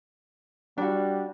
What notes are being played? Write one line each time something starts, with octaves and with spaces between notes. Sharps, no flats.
G3 D4 F#4